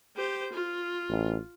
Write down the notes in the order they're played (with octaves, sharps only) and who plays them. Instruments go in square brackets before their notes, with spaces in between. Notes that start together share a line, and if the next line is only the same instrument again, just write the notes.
[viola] G4 C5
F4
[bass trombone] A1